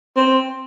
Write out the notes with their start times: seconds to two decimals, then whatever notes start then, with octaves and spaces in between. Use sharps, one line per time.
0.16 C4